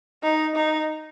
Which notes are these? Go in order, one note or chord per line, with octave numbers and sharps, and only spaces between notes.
D#4
D#4